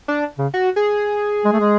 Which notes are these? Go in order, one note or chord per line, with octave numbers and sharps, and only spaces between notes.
D4
C#3
F#4
G#4
G#3
A3
G#3